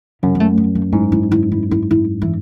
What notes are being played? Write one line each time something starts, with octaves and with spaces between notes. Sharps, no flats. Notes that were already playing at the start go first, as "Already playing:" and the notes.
F#2 C#3
B3
A3
B3
A3
G#2 E4
E4
E4
E4
E4
E4
E3